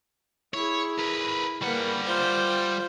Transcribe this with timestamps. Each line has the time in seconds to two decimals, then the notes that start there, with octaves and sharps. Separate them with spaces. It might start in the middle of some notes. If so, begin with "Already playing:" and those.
0.54 E4 G#4 C#5
0.98 A#4 B4
1.62 G3 A#3 B4 F#5
2.06 F4 C5